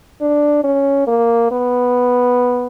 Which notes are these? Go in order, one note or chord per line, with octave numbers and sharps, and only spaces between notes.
D4
C#4
A#3
B3